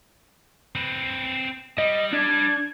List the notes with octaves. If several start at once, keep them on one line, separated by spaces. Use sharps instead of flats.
C4 B4
G3 D#5
D4 G#6